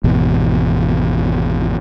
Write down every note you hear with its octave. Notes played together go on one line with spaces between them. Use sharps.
G#1 E2 B2